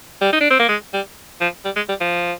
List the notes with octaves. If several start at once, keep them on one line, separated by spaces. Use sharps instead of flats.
G3
D#4
D4
C4
A#3
G#3
G3
F3
G3
G#3
G3
F3